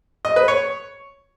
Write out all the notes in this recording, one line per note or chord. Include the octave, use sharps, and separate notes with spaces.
D#5
B4
C#5